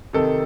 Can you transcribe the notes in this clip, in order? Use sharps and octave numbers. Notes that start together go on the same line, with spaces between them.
C3 D#3 A4